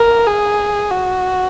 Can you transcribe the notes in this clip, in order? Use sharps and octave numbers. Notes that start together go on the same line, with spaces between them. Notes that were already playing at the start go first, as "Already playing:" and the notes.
Already playing: A#4
G#4
F#4